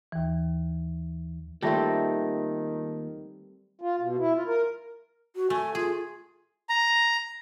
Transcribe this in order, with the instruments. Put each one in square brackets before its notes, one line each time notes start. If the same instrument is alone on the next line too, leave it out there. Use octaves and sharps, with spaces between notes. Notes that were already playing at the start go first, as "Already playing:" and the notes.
[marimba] D#2 E3
[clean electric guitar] D#2 [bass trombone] D#3 [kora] G3 A3 C4 [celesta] F4 A5 A#6
[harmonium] F4
B2
E4
F4
A#4
[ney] F#4
[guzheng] A3 [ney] G#5
[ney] F4 [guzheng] G#4
[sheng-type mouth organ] A#5